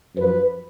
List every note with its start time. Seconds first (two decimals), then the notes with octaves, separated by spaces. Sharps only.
0.16 F#2 F3 B4